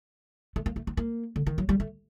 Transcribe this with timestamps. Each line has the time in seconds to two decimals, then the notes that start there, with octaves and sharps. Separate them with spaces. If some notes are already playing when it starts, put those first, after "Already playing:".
0.56 A3
0.66 A#3
0.76 A3
0.87 C4
0.97 A#3
1.36 D3
1.47 D#3
1.58 F#3
1.69 G3
1.80 A3